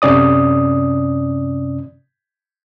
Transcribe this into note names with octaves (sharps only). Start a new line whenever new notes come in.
F#2 C3 C#4 D5 D#6